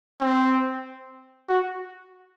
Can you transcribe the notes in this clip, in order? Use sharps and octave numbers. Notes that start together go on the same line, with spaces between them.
C4
F#4